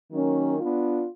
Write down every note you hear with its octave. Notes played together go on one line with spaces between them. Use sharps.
D#3 F#3 A#3 C#4
B3 D4 F4